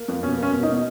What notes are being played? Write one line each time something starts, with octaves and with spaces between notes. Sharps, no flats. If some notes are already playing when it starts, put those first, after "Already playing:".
Already playing: A#3
F2
B2 C#4
A#3 C#4
B2
D#4
B2